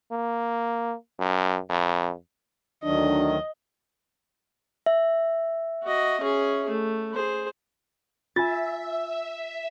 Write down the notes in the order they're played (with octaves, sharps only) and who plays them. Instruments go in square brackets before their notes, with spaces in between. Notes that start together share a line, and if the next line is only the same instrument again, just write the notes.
[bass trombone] A#3
F#2
F2
[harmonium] D2 D#3 F#3 [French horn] D4 [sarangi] D#5
[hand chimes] E5
[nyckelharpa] F#4 D#5
C#4 G#4
A3
G#4 C5
[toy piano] F4 [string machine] E5 [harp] G#5 A6